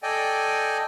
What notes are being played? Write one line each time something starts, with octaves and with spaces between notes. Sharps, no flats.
A4 D5 D#5 G5 G#5